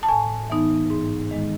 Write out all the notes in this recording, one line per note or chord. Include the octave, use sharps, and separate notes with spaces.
A5
A2 G#5
E3 B3 D#4
G#2
D#3 G#3 D#4